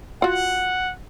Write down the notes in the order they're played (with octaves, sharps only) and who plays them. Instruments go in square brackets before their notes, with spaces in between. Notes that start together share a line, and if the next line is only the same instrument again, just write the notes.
[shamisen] F4 F#4 [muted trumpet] F#5